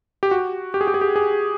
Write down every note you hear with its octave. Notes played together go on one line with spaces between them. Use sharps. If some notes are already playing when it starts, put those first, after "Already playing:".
G4
F#4
G4
G#4
G4
G#4
G4
G#4